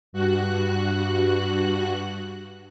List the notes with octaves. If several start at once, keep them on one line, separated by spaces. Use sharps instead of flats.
G2 F#4 F#6